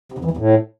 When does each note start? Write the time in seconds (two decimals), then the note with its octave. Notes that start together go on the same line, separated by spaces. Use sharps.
0.12 C3
0.18 F2
0.25 E3
0.31 E2
0.37 A2